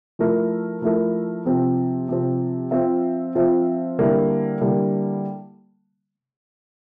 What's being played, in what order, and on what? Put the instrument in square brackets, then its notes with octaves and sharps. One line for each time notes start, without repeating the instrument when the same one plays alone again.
[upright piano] F3 A3 E4 A#4
F3 A3 E4 A#4
C3 F3 C4
C3 F3 C4
F3 C4 F4 C5 E5
F3 C4 F4 C5 E5
D3 G3 A#3 E4
D3 G3 A#3 E4